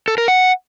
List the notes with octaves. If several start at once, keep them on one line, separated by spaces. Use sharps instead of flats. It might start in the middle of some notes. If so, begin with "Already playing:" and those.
A4
A#4
F#5